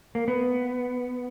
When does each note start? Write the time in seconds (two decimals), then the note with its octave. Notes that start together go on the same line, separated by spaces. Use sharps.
0.15 A#3
0.28 B3